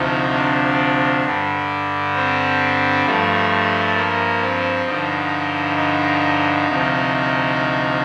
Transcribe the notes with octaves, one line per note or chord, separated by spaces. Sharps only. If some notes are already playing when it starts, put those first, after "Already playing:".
Already playing: D2 C3 F3 D#4
D4
G2 D3 G3
C4
G2 F3 A3
A#3
C4
G2 D3 F3 D#4
D#4
D2 C3 F3